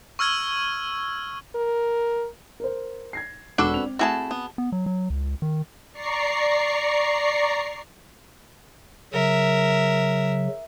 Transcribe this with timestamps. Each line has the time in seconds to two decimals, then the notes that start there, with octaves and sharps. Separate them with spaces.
0.19 C#6 E6 F6 G#6 D#7
1.55 A#4
2.60 A#4 C5
3.13 G#6 A#6 C7
3.58 E1 D4 F#4 A4 B4 E6 G7
3.74 C4 F7
3.99 A3 C4 E4 F#4 G#4 A5
4.31 B3
4.58 B3
4.72 F#3
4.86 F#3
5.10 C#2
5.42 D#3
5.93 D5 A#5 C#6 C7
9.13 C#3 F#3 A#4 E5